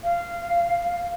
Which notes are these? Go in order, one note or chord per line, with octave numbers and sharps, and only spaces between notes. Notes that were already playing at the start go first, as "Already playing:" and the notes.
F5